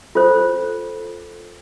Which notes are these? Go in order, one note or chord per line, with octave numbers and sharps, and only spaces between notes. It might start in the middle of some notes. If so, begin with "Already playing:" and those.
F4 A4 C5